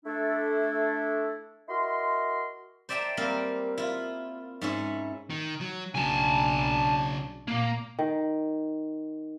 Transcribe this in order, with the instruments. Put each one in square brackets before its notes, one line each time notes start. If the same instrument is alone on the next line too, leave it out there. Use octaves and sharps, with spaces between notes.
[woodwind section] A3 D4 E4 A4
E4 F#4 A#4 D#5 C6
[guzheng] C5 D5 E5 G5 A5 A#5
G3 A#3 C4 A#4
E4 F4
G#2 C#4 E4
[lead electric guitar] D#3
F#3
[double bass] B1 D4 [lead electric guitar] C#3 F#3 [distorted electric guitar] G#5 A5
[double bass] A#2 [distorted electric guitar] A#3
[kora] D#3